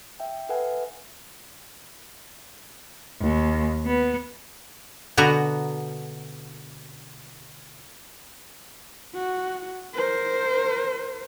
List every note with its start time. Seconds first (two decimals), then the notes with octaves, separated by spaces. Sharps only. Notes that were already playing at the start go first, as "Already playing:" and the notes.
0.20 E5 G5
0.49 A4 B4 E5 F#5 G#5
3.21 D#2
3.86 B3
5.17 B2 D3 B3 F#4 A#5
9.15 F#4
9.95 A#4 C5